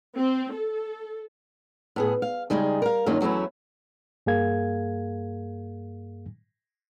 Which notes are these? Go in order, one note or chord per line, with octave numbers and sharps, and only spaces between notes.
C4
A4
A2 B3 G#4
F5
C#3 G3 G#3 D#4 G#4
A#4 F5
G2 D#3 F#3 A#3 C#4 F4
E2 F#3 A3 C#4 E4
G2 A#3 G#4 A#4 F5 G#6